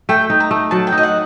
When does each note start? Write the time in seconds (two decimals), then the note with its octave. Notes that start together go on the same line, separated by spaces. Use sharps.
0.09 A3 G5
0.30 D#4
0.40 A#5
0.51 A3
0.71 F#3 A5
0.87 G5
0.92 D#4
0.98 D#5
1.03 F#5